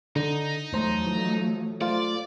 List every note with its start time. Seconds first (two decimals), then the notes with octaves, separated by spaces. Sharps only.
0.16 D3 D#4
0.73 E2 F3 F#3 A3 C5 A#5
1.07 E3
1.81 A3 F4 C5 D5